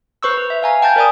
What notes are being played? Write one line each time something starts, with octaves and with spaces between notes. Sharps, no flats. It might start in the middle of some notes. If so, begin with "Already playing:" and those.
B4 C5 C#6 E6
B4
E5
F5 G#5 A#5
G5 A5 A#5 G6 A6
A#4 C5 D5 G#5 A#5 D#6